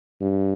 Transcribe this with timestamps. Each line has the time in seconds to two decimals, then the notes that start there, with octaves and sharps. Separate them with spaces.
0.21 G2